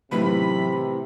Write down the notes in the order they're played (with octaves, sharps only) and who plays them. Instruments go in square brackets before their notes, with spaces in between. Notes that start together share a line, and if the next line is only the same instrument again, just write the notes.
[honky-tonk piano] A2 D#3 B3 [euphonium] C3 [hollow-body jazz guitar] E3 F#3 [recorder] B5